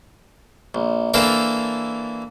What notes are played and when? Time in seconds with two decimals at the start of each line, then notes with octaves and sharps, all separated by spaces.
0.75 A#1
1.14 E3 A#3 D4 A4 A#4 C5